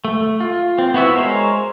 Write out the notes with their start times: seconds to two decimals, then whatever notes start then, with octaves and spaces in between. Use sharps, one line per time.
0.05 A3
0.40 F4
0.78 C4
0.94 B3 E4 F#4 E5
1.15 G#3 A#4 C5 C#5